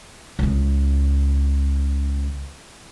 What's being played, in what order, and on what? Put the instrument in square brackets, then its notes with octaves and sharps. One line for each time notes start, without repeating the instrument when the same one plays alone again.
[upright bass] C#2 C#3